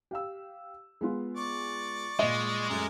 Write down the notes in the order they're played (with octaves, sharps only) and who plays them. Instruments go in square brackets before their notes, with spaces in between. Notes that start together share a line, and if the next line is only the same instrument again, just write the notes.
[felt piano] G4 F5 E6
G#3 B3 F4
[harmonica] D5 C#6
[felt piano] A#2 D#5 [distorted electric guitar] G#3
[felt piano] F#2 A3 F#6 [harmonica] A#4 D5 G#5